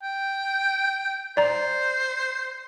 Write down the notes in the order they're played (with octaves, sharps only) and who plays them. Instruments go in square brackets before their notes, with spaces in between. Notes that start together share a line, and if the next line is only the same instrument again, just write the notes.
[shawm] G5
[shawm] C5 [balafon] D5 A#5